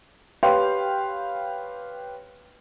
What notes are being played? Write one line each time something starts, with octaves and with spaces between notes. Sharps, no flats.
G4 B4 C#5 F5 G5 C6